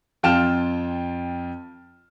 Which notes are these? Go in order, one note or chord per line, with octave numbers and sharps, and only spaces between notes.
F2 F4 G5 A5 F6 E7